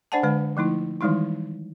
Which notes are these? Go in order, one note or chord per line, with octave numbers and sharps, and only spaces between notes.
D4 C5 D5 F#5 G#5 A5
D3 G#3 B4
F3 A3 D#4 E4
D#3 E3 G3 G#3 D#4 E4